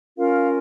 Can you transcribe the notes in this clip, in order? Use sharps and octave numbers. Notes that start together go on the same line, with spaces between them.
C#4 F4 A#4 F5